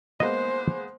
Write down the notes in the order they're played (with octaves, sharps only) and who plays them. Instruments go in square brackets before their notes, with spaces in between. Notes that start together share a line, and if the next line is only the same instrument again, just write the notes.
[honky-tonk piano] G#3 A#3 B3 [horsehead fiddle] C5 [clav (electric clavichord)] D#5